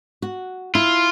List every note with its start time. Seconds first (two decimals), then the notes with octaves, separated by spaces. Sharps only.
0.22 F#4
0.75 E4 F4